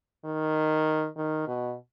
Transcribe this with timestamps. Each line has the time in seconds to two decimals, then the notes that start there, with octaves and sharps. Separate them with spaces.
0.25 D#3
1.17 D#3
1.48 B2